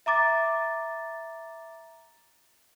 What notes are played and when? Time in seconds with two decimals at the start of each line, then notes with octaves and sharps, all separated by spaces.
0.06 E5 A#5 D6 A6